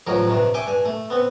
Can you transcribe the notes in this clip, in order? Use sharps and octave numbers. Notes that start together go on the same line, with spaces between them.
A1 D#3 F3 F#3 A#4 C#5
G2 C3 D#3
E5 G5 G#5 C#6 D6
G2 G#5
A3
B3 C4